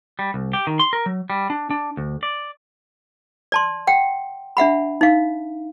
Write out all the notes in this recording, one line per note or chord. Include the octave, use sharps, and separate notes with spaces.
G3
C2
G4
D#3
C6
A#4
F#3
G3
D4
D4
D2
D5
D5 A5 C6
F#5 G5
D4 E5 F#5 B5
D#4 F5